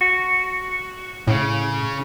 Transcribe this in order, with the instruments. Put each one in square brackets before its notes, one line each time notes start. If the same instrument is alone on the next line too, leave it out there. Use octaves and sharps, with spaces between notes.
[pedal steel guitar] F#4
[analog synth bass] A2 [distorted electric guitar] C#3